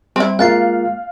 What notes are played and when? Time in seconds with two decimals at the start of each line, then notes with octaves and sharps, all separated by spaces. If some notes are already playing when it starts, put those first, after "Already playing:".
0.16 G3 C4 E4 G5
0.39 G#3 A#3 F4 F5 F#6 A6 C7